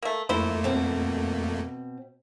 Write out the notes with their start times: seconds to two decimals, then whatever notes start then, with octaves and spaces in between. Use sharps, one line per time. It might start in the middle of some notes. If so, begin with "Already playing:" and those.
0.03 A3 A#3
0.29 F2 A3 A#3 E4 C5
0.64 B2 C4